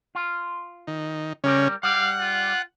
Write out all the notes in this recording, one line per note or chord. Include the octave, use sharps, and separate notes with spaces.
F4
D#3
C#3 G3 C#4 A#4 D5
G3 D5 F5 F#5
F4